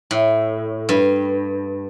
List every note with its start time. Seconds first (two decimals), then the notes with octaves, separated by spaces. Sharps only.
0.11 A2
0.89 G2